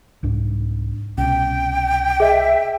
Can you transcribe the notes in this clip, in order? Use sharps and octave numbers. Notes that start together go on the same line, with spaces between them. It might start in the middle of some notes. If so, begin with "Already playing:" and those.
C2 G#2 D4
C2 B2 C#4 G5
G#4 D#5 E5